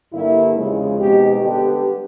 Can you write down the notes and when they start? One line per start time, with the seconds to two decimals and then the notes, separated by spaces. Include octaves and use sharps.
0.12 G2 D3 G3 A#3 E4
0.55 E2 C#3 F3 G#3
0.98 B2 G#3 C4 D#4 G4
1.41 D3 G3 B3 D4 G4